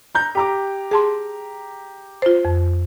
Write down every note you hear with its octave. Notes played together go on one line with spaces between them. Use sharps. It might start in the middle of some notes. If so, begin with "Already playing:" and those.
A#5 G6
G4 A#5 D6
G#4 A5 C6
F4 C5
F2